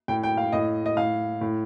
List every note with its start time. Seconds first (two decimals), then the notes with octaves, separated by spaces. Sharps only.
0.08 A2 G5
0.23 G5
0.37 F5
0.52 A2 D#5
0.86 D#5
0.97 A2 F5
1.41 A2